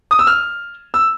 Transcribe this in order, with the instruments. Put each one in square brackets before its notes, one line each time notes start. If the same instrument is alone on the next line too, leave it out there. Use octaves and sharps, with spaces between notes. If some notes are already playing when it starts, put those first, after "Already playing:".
[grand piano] D#6
E6
F6
E6